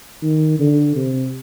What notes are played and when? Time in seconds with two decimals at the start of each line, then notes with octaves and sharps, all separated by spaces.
0.23 D#3
0.59 D3
0.96 C3